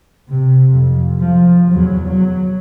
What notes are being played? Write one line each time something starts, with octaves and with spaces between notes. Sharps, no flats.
C3
F2
F3
E2 F#3
F#3